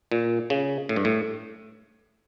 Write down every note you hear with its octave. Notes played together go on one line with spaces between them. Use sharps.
A#2
C#3
A2
G2
A2